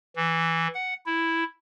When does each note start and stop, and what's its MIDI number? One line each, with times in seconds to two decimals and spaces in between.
0.16 0.67 52
0.74 0.94 78
1.06 1.44 64